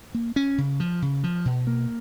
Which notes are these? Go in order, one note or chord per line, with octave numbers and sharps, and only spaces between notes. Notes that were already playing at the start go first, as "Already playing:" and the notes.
A#3
C#4
C#3
F3
C#3
F3
B2
A#3